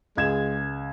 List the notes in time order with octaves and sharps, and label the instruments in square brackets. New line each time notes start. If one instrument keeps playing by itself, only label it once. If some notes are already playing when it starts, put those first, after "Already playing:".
[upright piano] C#2 G#6 E7 [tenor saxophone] G#3